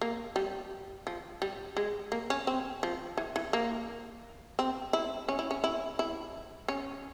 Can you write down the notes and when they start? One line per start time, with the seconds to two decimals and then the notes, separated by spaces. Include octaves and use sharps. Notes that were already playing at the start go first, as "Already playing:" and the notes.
0.01 A#3
0.36 G3
1.07 F3
1.42 G3
1.77 G#3
2.12 A#3
2.30 C#4
2.47 C4
2.83 F3
3.18 E3
3.36 E3
3.53 A#3
4.59 C4
4.93 E4
5.28 C#4
5.39 E4
5.51 C#4
5.64 E4
5.99 E4
6.68 C#4